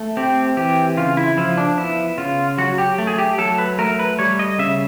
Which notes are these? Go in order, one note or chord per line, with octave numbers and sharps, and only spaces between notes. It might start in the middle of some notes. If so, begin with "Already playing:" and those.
Already playing: A3
C4 G4
E3 G4
C#3 F4
E4
F3 E4
D4
B3 E4
C#3 F4
F#3 F#4
G4
A3
G#4
G4
F#3 A4
B4
A3 A#4
B4
G3 C#5
D#5
C#3 E5